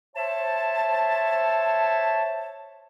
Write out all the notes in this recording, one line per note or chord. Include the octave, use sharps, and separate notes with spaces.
C5 C#5 E5 A5